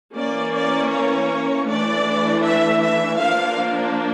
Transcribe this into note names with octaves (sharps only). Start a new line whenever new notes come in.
E3 A#3 C#4 D5
D5
C#5
E3 A3 D4 D5
E5
E5
F3 A#3 D4 F5